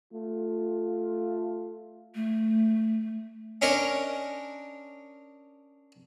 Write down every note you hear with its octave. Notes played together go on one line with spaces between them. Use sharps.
A3 F4
A3
C#4 D4 A#4 C#5 D#5